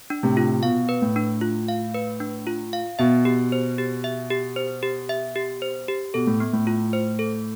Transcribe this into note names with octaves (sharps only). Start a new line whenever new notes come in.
D4
A2 C3
F4
B2 F5
B4
A2
D4
F4
F5
B4
D4
F4
F5
B2 E5
G4
C5
G4
E5
G4
C5
G4
E5
G4
C5
G4
B2 A4
A2
B3
A2
F4
C5
A4